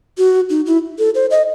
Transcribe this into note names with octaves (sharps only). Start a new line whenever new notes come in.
F#4
D#4
E4
A4
C5
D#5